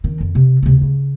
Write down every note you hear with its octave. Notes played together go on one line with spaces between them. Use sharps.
D#3 C4
F2
C3
D2 C3
C#3